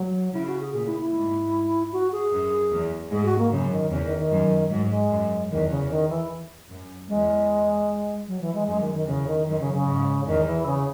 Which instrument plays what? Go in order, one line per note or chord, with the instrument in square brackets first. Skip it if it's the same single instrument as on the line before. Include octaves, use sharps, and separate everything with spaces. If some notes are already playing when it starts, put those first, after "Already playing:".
Already playing: [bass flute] F#3
[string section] C#3 [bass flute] E4
[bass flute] F#4
G#4
[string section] A#2 [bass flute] G#4
[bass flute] E4
E4
[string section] G#2
[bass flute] F#4
G#4
[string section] F#2
E2
[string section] G#2 [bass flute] G#4
[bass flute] F#4
A#3
[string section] F#2 [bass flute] C#3
[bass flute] D#3
[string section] E2 [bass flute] C#3
[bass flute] D#3
D#3
[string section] F#2
[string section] G#2 [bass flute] F#3
[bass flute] G#3
[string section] F#2
[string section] E2 [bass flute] D#3
[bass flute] C#3
D#3
E3
[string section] F#2
[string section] E2 [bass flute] G#3
[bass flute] F#3
E3
G#3
[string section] F#2 [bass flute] G#3
[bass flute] D#3
D#3
[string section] E2 [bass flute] C#3
[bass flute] D#3
[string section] F#2 [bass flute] D#3
[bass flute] C#3
C#3
[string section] G#2
[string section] E2 [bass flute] D#3
[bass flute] E3
C#3